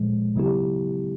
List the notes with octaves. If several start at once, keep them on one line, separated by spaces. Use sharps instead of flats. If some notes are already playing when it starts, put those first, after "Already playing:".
Already playing: A#2 F3 G#3
C#3 F#3 B3 E4 G4